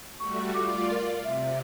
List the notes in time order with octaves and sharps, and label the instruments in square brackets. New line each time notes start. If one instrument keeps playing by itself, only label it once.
[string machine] G3 A3 F#4 [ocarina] C#6
[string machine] F4 D5 [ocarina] D6
[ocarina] A#4
[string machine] C3 [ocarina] E5